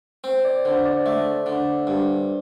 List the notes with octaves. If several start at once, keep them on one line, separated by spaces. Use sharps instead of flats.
C4
D5
D3 C5
D5
A3 E5
D3
G2